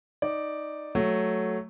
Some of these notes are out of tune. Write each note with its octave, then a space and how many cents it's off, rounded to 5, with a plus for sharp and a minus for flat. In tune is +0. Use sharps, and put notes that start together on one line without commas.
D#4 +0 D5 +0
F#3 +0 A3 +0